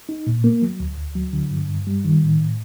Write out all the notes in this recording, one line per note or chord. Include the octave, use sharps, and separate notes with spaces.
D#4
A#2
A#3
F#3
D2
D2
F#3
D3
G2
G2
G3
D#3
A2
A2